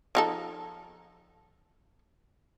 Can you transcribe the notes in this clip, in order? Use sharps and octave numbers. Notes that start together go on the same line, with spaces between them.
F3 D#4 A4